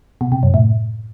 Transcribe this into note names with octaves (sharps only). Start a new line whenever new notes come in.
B2
C3
F#2
A2